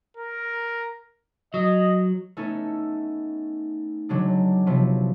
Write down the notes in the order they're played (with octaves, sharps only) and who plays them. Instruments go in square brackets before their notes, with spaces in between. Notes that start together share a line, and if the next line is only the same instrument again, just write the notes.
[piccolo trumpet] A#4
[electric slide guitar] F#3 [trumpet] D#5
[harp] A3 B3 C#4 D#4 A4
D3 F#3 G#3 D4
C3 F3 F#3 B3